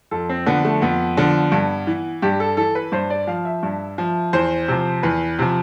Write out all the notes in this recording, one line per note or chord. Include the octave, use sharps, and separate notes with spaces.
F2 A4
C4
D3 F3 B3
A3
F2 B3
D3 F3
G2
E3
G2 G4
A4
E3 A4
B4
G2 C5
D5
F3 F5
E5
G2
F3
E2 C5
C3 F3
E2 B4
C3 F3